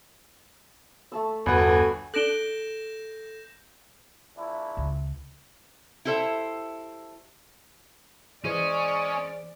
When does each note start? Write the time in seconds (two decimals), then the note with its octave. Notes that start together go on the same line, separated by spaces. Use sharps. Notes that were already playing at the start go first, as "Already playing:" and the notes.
1.12 A3 A5 E6
1.46 G1 E2 F#4 A4 B4 F#5 G#5
2.14 D4 A4 F#6 G6 A#6 D7 E7 G7
4.37 A#1 D4 E4
4.77 C#2
6.05 E4 G4 A4 C5 E5
8.45 E3 G#3 C#4 G#4 C5 D5